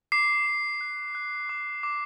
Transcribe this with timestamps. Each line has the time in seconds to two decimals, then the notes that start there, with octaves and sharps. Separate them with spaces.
0.12 D6 C7
0.47 D6
0.81 F#6
1.15 F#6
1.49 D6
1.83 D6